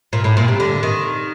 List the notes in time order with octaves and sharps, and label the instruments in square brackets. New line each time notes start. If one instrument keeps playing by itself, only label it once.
[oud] A#2
A2
A#2
C3
D3
D#3